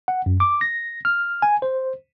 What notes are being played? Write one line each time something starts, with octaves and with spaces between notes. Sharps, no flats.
F#5
F#2
D6
A#6
F6
G#5
C5